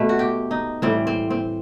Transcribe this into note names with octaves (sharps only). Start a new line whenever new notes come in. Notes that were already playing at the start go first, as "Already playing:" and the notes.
Already playing: B2 A3 B4
F#4
G4
D#4
A2 E3 G3 C4
C4
C4